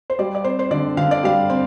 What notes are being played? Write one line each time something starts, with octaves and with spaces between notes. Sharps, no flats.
C5
G3 D5
D5
C4 C5
C5
D3 D5
D3 F5
D5
G3 F5
C4